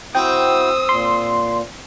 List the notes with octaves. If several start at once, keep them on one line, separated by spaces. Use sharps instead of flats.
C4 E4 F#4 G5 D#6 E6
A#2 C6